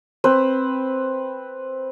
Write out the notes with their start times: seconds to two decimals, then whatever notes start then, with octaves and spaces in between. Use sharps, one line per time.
0.24 C4 B4